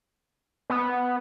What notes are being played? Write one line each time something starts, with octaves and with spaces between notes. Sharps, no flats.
B3